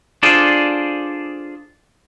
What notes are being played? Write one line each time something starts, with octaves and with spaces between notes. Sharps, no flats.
D4 F4 G#4 A4 C5 D5